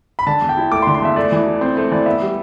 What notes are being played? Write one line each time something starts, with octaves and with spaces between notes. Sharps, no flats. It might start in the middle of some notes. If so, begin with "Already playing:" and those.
B5
D3 A5
E2
G5
E4
A3 D6
C6
D3
C6
E2 E5
A3 D5
E3
E4
C4 C5
A3 C5
E3 D5
B3 E5
G3